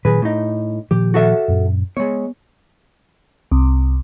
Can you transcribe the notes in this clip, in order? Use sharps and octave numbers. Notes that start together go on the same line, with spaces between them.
A#2 D#3 F#3 G#4 B4
A2 A3 D#4
A#2 D#3 F3 G4
F#4 A4 E5
F#2 A#2
G#3 B3 C#5
C2